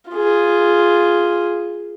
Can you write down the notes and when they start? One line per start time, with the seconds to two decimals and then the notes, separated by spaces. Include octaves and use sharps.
0.11 F4 G#4